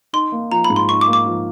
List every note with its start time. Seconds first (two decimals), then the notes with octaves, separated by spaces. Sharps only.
0.13 D#4 C6
0.32 A#3
0.52 F3 A#5
0.64 B5
0.70 G#2
0.76 C6
0.89 D#4 C#6
1.01 D6
1.07 A#3
1.13 D6
1.26 F3